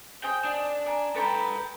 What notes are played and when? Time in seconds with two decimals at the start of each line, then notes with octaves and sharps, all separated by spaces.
0.23 G#4 C5 D#5 G5
0.44 D4
0.86 D5 G#5 A#5
1.16 A4 B4 G5 A#5 B5